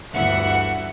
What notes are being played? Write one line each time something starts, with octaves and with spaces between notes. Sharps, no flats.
G1 D2 E3 E5 F#5 C#7